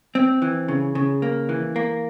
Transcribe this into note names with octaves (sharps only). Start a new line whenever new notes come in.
C4
E3
C#3
C#3
A#3
E3
A#3